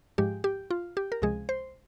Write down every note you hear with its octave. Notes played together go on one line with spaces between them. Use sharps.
G#2 F3 G#3 G4
G4
F4
G4
A#4
C#2 C3 F3 G#3 G#4
C5